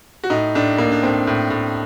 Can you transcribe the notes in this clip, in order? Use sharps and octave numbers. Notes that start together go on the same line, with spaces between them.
F#4
A2 D#4
A2 D4
A2 A#3
D4
A2 C4
A2
A2